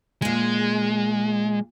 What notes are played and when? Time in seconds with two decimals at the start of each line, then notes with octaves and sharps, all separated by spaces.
0.22 A#2 G#3 G#4